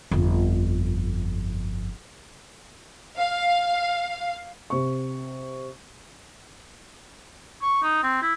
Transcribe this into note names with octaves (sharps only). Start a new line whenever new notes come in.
G1 F2
F5
C3 C#6
C#6
D#4
C4
E4